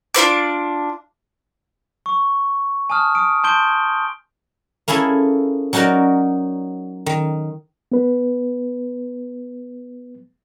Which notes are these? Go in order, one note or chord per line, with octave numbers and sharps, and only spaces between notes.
D4 F4 B4 D6
C#6
G#5 A5 D#6 F6
D#6 D7
A5 C6 G6 D7 G7
A#3 C#4 E4 G#4 A4
F#3 C#4 D#4 F#4 A#4 D5
D#3
B3 B4